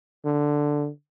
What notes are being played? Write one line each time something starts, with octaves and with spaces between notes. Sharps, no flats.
D3